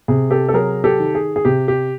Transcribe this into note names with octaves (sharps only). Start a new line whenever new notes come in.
C3 G#4
G4 A4
A4
F#3 G#4 A#4
G4 A4
D#3
G#4
G#4
C3 G4
G4